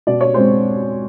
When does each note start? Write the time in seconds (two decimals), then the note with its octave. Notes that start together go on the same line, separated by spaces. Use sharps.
0.07 B2 D5
0.21 C#5
0.34 G#3 C4 C5